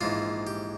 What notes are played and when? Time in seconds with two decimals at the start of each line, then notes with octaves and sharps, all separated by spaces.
0.01 A#1 G#2 E3 F4
0.47 G4